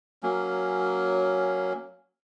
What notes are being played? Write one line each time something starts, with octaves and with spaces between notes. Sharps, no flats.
F#3 A#3 C#4